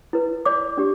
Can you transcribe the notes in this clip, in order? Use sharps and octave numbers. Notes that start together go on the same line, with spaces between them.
E4 B4
D5 D6
D4 G4